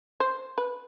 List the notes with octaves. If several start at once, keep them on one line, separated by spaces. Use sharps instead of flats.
C5
B4